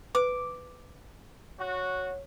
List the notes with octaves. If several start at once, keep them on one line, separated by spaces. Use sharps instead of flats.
B4 D6
F#4 C#5